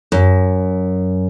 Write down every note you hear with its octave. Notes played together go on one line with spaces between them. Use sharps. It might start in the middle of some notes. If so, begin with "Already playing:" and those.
F#2